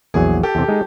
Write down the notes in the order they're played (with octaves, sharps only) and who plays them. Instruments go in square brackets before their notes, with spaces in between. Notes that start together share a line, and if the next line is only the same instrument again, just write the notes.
[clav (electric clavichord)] A#1 E2 F#3 [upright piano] G#4
[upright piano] G4 A4
[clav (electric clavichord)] E2 C3
G#3 D#4 G#4